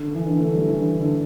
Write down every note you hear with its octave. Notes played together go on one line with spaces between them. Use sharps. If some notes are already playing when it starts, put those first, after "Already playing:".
Already playing: D3
E3
D3
A3
G3
E3
D3
D3